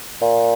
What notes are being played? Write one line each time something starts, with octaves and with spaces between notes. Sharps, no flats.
A#2